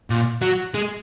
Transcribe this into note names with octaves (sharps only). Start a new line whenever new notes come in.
A#2
F#3
G#3